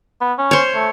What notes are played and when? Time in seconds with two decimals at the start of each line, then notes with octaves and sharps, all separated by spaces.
0.21 B3
0.38 C#4
0.51 C5 C#5
0.75 A3